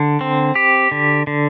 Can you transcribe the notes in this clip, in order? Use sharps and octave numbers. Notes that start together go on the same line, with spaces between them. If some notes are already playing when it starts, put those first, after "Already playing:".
Already playing: D3
C4
G4
D3
D3